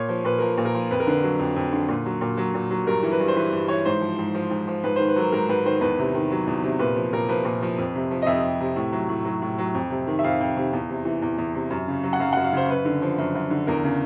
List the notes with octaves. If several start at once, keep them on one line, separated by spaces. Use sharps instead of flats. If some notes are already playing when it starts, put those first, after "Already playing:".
Already playing: A#2 C#5
F3
A#2 B4
F3 A#4
A#2
A#4
F3
F2 B4
A#4
D3 B4
F#3
F2
F2
D3
A#2
F#3
A#2
F#3
A#2
F#3
G2 A#4
E3
B4
G2
C5
E3 B4
G2
E3 C#5
G#2 C5
F3
G#2
F3
G#2
F3
G#2 B4
D#3 C5
B4
F#3 A#4
G#2 A#4
G#2 B4
D#3 C5
E2 B4
C3
D#3
F#3
E2
C3
A#2 B4
F3
A#2 A#4
F3 B4
A#2
F3
F2
C3
F3
D#5
F2 E5
F2
C3
A2
F#3
A2
F#3
A2
F#3
F2
C3
D#3
E5
F2 F5
F2
C3
E2
C3
E3
E2
E2
C3
F#2
C#3
F#3
F#5
F#2 F5
F#2 F#5
F5
C#3 C5
F#2 B4
D3
F3
F#2
F#2
D3
E2 A#4
C#3